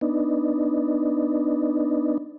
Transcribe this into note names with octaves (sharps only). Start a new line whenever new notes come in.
B3 D4 D#4